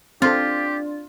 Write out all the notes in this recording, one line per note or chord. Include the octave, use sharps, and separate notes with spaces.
C4 D4 F4 G4 A4